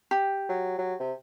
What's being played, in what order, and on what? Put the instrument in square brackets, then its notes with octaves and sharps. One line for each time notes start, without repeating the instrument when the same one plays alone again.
[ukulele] G4
[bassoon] F#3
F#3
C3